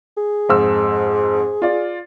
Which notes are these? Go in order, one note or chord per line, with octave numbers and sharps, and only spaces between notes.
G#4
F2 G#2 E6
F4 D5